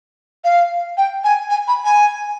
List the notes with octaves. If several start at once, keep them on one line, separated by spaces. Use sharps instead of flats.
F5
G5
G#5
G#5
B5
G#5